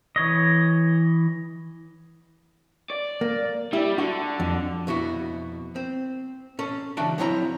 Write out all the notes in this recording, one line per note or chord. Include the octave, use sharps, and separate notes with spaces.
E3 C#5 D#5
D5
A#3
G3 E4
D3 F#4
F2
F2 B2 E4 F#4
C4
C#4 A4
C#2 E3 D4 F#4 G5 A5
F3 F#3 C4 E4 C#5 A#5